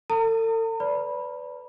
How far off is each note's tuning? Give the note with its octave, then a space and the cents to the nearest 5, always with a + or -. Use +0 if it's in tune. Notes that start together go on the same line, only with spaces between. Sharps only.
A4 +40 A#5 -45
B4 +20 D5 -20 B5 -10